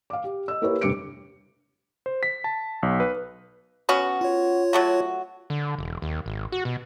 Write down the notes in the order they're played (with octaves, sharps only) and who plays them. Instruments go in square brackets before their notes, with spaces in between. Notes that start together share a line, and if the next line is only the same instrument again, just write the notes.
[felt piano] F5 D6
G4
D#5 E6
A#3 E4 G4 A#4 B4 C#5
F1 G2 G3 D6 C#7 D7
[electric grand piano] C5
B6
A5
B1
B4
[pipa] B3 C#4 F#4
[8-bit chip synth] F4 C#5
[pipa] F#3 A3 F#4
[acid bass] D3
E1
D#2
G#1
F#4
B2